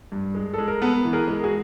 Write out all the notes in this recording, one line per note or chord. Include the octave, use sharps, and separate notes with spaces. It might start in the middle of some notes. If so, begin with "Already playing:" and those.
G2
G#3
G#3 A4
A#4
B3 A4 B4
E3
G#4 A#4
G#3
F#4 G#4